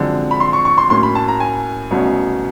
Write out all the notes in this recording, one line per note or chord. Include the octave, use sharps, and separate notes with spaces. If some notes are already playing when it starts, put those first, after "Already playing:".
Already playing: F#2 D3 F3 G#3 C4
B5
C6
C#6
C#6
C6
A2 F#3 A#3 C#4 C6
B5
A5
A#5
G#5
C2 B2 F#3 A3 C#4